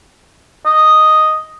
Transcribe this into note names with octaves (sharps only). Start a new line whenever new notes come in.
D#5